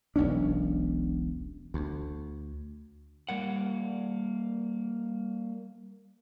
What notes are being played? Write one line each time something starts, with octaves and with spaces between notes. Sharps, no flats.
E1 B1 C#4 D4
D2
G3 A#3 F#5